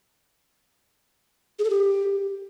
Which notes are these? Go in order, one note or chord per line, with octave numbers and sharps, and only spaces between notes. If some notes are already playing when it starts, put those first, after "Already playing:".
G#4
A4
G4